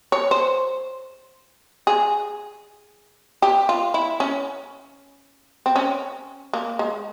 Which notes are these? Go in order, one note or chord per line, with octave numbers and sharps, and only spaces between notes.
C#5
C5
G#4
G4
F4
E4
C#4
C4
C#4
A#3
G#3